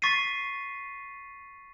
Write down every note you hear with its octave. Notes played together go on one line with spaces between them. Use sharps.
C#6 A6 B6 C7 D#7